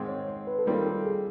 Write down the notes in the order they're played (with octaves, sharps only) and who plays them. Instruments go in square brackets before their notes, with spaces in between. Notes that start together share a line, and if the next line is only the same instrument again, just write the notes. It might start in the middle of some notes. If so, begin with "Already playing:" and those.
Already playing: [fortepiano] G#2 D#3 G#3 C4
[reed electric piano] C#5
B4
A4
[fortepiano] D#3 G3 C4 F4 [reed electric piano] A#4
[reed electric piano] A4
G#4